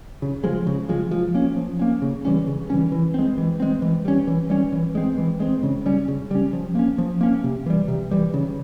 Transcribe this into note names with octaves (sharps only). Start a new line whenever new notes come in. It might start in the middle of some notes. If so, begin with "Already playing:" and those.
C#3
F3 G#3
C#3
F3 G#3
F3
A#3 C#4
F3
A#3 C#4
C#3
E3 G3 C#4
C#3
E3 G3 C#4
E3
G#3 C4
E3
G#3 C4
E3
G3 C#4
E3
G3 C#4
E3
G#3 C4
E3
G#3 C4
C#3
G3 C#4
C#3
G3 C#4
F3
A#3 C#4
F3
A#3 C#4
C3
E3 G3
C3
E3 G3
C#3